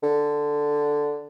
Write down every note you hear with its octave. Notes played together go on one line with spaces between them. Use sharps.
D3